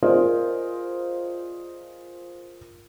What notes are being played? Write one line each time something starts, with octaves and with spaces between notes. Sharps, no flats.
F4 G#4 A#4 C5 D5 D#5